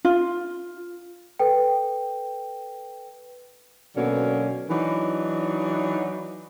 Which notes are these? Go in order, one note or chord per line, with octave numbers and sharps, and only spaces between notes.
F4
A4 B4 G5
B2 D3 F#3 A#3 C#4
E3 F#3 D4 D#4